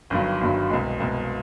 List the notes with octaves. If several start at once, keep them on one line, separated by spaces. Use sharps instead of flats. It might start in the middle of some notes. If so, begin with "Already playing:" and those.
G1 G2 D#3 F#3
G1 G2 D#3 F#3
C2 B2 G#3
C2 B2 G#3